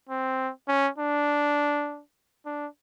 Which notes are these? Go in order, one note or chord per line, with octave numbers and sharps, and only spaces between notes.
C4
C#4
D4
D4